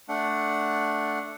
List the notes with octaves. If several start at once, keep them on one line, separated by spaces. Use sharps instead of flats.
A3 D4 F#5